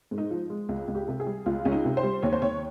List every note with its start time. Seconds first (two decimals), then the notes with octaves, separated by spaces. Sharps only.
0.11 G#2
0.18 D#4
0.31 F3
0.50 G#3
0.69 C#2
0.88 C#2
0.95 G4
1.08 C3
1.20 G#4
1.27 G3
1.46 C#2 F4
1.65 C#2 C#4
1.72 D#4
1.85 C3
1.97 C5
2.03 G3
2.22 D#2 C#5
2.33 C5
2.42 D#2 C#5